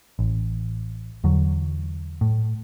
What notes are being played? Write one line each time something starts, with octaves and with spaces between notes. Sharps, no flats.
A1
E2 D3 F#3
A2